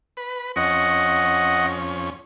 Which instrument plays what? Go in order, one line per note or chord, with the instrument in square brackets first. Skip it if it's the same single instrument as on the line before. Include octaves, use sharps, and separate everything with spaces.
[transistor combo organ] B4
[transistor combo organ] F2 C#4 [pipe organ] D#5 F#5